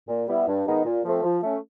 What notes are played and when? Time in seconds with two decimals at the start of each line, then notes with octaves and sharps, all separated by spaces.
0.08 A#2
0.28 G3 B3 E4
0.48 G2
0.66 D#3 G#3 B3 D#4
0.85 A#2
1.04 F3 A3 C4
1.23 F3
1.42 A3 C#4